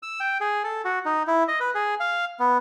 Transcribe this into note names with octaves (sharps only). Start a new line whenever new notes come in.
E6
G5
G#4
A4
F#4
D#4
E4
D#5
B4
G#4
F5
B3